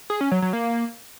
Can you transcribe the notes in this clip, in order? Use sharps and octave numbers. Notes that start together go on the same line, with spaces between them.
G#4
C#4
F#3
F#3
A#3